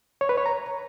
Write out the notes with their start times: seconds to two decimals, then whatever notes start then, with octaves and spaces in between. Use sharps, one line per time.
0.21 C#5
0.29 B4
0.37 C#5
0.46 A#5